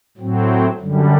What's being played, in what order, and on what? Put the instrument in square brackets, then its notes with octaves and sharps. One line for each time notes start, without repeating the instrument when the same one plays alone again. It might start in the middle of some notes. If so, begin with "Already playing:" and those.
[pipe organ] A2 F#3 C4
F#2 D3 G3